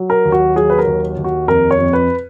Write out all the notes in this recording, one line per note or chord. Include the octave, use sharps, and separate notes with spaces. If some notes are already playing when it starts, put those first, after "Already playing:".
Already playing: F#3
A#4
D#2
F#4
F#3 G#4
B4
A#4
D#2
D#2
F#4
F2 A#4
C#5
F2
B4